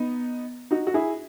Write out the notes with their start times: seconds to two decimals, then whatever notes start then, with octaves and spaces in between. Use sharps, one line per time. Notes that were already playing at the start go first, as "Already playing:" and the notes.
Already playing: B3 D#4
0.71 D#4 F#4
0.87 F#4
0.94 E4 G#4